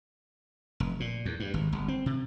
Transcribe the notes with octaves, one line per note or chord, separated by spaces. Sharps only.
F1
A#2
E2
G2
G#1
G1
C4
C3